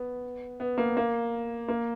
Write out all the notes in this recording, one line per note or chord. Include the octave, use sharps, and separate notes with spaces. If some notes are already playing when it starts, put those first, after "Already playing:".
Already playing: B3
B3
A#3
A#3
A#3